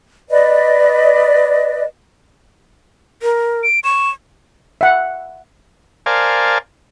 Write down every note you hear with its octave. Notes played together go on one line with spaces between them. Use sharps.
B4 D5 D#5
A#4
D7
C#6 E7
E5 F#5
A#4 C5 D5 F5 G#5 A5